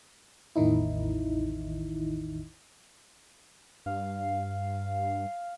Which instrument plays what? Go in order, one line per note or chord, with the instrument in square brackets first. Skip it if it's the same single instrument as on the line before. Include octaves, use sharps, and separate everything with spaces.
[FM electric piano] A1 E2 D#3 D#4 E4
[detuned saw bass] G2 [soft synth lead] F5